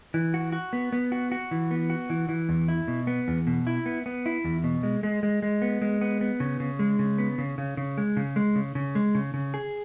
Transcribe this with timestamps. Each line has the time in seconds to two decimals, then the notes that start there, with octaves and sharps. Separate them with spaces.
0.14 E3
0.34 F#4
0.52 F#4
0.73 B3
0.92 B3
1.12 F#4
1.32 F#4
1.51 E3
1.71 B3
1.90 F#4
2.10 E3
2.29 E3
2.49 E2
2.68 E4
2.88 B2
3.07 B3
3.28 E2
3.47 B2
3.67 E4
3.86 B3
4.06 B3
4.26 E4
4.44 E2
4.64 B2
4.83 G#3
5.03 G#3
5.23 G#3
5.42 G#3
5.62 B3
5.82 G#3
6.01 B3
6.21 B3
6.40 C#3
6.60 C#3
6.79 G#3
6.99 C#3
7.18 B3
7.38 C#3
7.58 C#3
7.77 C#3
7.98 G#3
8.17 C#3
8.36 G#3
8.55 C#3
8.75 C#3
8.95 G#3
9.15 C#3
9.34 C#3
9.54 G#4